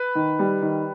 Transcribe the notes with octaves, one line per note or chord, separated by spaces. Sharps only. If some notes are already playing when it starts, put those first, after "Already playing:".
Already playing: B4
D#3
G3
D#3